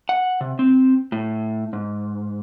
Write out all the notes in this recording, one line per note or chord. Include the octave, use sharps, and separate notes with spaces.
F#5
C3
C4
A2
G#2